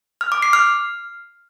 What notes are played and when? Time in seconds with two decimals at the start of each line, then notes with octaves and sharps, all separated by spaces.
0.21 F6
0.32 D6
0.42 C7
0.53 F6